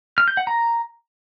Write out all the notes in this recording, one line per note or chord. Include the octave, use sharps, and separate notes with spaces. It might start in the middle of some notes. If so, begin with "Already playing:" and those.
F6
G6
F#5
A#5